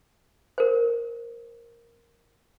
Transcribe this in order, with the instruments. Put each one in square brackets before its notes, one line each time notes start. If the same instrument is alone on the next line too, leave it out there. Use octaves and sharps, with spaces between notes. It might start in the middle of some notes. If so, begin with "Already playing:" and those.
[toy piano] A#4 C5